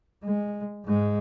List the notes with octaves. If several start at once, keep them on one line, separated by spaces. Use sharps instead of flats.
G#3
G#2 G#3